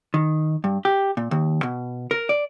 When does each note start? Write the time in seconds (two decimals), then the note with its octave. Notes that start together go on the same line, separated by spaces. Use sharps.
0.14 D#3
0.64 G2
0.85 G4
1.17 A#2
1.31 D#2
1.63 B2
2.11 A#4
2.29 D5